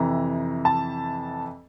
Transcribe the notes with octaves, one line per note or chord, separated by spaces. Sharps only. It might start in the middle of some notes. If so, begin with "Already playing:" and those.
Already playing: F2 C3 E3 A#5
A5